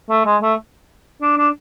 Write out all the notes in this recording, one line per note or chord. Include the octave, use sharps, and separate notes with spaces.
A3
G#3
A3
D4
D4